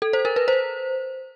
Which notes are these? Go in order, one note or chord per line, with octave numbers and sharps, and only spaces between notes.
A4
C5
A#4
B4
C5